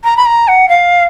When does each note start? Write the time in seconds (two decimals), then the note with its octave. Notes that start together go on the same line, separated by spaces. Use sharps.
0.04 A#5
0.17 B5
0.25 A#5
0.48 F#5
0.69 F5